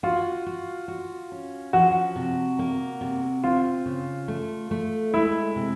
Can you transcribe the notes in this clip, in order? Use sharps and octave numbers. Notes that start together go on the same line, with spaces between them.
F4 F#4
F#4
F#4
C#4
F3 F#4
C3
A#3
C3
C4 F4
C#3
A3
A3
G#3 E4
C3